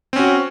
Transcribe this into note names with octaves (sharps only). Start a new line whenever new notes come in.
C4 C#4 F#4